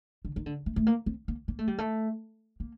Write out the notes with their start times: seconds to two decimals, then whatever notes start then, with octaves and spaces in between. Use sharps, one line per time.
0.25 D3
0.36 D#3
0.46 D3
0.66 A3
0.76 A3
0.87 A#3
1.06 C4
1.28 A#3
1.48 A#3
1.59 A3
1.67 G3
1.78 A3
2.60 A#3